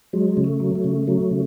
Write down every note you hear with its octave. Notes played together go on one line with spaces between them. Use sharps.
F#3 G#3
C#3
A3
F#3
A3
C#3
F#3 A3
C#3